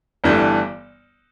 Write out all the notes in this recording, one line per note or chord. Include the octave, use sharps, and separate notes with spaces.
G1 G2 E3 A3